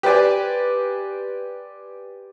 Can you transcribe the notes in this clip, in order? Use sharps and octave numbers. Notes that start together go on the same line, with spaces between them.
G4 B4 C5 D5 G#5